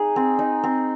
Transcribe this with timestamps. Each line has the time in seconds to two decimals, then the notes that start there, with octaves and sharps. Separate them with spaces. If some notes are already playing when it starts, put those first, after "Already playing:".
Already playing: D#4 G#4
0.16 C4
0.39 D#4
0.64 C4